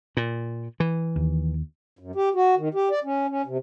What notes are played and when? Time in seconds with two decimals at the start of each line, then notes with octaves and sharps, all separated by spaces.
0.17 A#2
0.80 E3
1.16 D#2
1.99 F#2
2.16 G4
2.34 F#4
2.57 D#3
2.74 G4
2.91 D5
3.04 C#4
3.28 C#4
3.46 C3